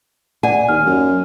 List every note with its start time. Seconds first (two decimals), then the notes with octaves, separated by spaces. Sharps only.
0.43 D5 F#5 G#5
0.69 D#2 F6
0.86 F#2